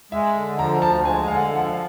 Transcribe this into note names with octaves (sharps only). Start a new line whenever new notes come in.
G#3 E5
D3
F3 A#5
D2 A5
G#3 G#5
D3 F5
F#5
F3 F#5
F5